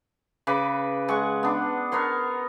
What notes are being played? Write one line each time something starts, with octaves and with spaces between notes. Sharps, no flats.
C#3 B4 D6
G#3 F#5 C#6
B3 D4
B3 A#4 C#5 C6